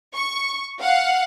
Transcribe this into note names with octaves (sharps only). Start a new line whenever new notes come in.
C#6
F5 F#5